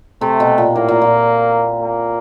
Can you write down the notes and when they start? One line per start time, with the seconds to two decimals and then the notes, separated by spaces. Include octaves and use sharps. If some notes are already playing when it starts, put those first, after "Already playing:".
0.21 C3 A3
0.40 B2
0.58 A#2
0.75 A2 A#3
0.89 A#2
1.02 A#2
1.82 A#3